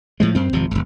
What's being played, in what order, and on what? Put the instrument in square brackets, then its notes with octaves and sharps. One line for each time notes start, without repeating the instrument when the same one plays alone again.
[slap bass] A2 F3 G#3
F#2 C4
G#1 F2 C3 F3
E1 A#1